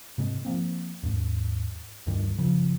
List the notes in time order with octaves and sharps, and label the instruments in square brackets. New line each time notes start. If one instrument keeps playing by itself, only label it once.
[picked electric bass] G#2 C3 G#3
F3 A#3 C4
D#2 G#2
D2 G2 D#3 G3
F#1 C#3 F3